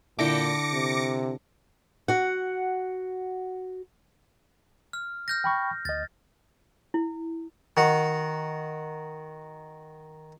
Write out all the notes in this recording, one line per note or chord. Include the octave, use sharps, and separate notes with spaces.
A#2 D3 E4 G5 D6 A#6 C#7
C3
F#4 F#5
F6
F6 G6 A#6
G5 B5 C#6
D2 D#5 A6
E4
D#3 F#4